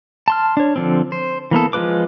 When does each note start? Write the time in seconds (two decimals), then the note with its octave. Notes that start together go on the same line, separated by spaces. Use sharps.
0.28 A5 C6 F6
0.57 D4 C#5
0.76 D3 F3 C4
1.12 C5
1.51 E3 A#3 B3 A4
1.73 F3 G#3 F4 B4 D6